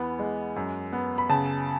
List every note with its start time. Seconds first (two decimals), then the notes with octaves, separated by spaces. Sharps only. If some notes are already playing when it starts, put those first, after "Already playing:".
Already playing: E2 E3 B3
0.19 G#3
0.56 F#2
0.93 B3
1.18 B5
1.29 C#3 A5